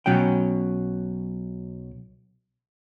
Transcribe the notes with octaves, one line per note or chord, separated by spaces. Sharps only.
B1 B2 F#3 C#4 G5